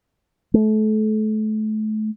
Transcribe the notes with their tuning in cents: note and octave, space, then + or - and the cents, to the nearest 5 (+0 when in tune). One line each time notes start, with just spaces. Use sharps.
A3 -30